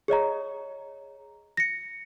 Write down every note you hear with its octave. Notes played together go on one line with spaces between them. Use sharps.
G#4 C#5 D#5 A#5
A#6 C#7